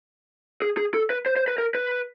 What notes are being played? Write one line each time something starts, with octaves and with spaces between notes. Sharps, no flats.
G#4
G#4
A4
B4
C5
C5
B4
A#4
B4